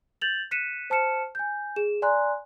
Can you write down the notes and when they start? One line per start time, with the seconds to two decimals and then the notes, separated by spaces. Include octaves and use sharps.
0.22 G6 A6 F7 F#7
0.51 F#6 B6 C#7 D#7 E7
0.90 C5 A5 F6 C#7 E7
1.35 G#5 G6
1.76 G#4 E7
2.02 D5 G#5 A#5 C6 F#6